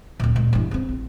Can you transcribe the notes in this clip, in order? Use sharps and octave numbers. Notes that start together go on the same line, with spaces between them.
D1 A#2
A#2 G#3
G2 E3
C#3 C4
A1